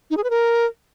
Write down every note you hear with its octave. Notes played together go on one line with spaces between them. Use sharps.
D#4
G#4
B4
A#4